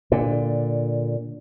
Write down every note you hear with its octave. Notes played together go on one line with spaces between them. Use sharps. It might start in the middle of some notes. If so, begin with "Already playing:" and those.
A#2 D3